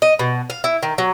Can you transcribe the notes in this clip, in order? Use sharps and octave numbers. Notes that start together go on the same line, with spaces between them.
D#5
B2
F5
E4
D#3
F#3